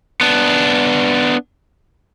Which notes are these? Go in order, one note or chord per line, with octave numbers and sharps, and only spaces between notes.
B3 D4